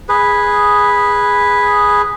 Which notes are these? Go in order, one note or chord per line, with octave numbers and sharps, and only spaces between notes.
G#4 B4